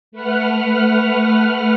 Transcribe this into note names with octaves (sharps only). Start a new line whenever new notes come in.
A3 B4 F#5 F6